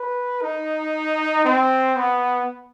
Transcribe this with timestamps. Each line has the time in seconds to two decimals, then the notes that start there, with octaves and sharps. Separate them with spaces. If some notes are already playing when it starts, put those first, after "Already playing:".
Already playing: B4
0.42 D#4
1.45 C4
1.96 B3